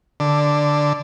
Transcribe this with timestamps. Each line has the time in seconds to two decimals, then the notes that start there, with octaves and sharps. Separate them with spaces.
0.20 D3